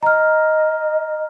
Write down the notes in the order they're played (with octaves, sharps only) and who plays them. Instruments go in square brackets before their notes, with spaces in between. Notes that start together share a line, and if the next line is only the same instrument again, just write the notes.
[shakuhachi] D#5 [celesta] A#5 F6